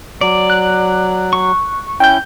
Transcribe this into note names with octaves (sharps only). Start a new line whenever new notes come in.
F#3 D5
F#6
C#6
C#4 E4 G5 G6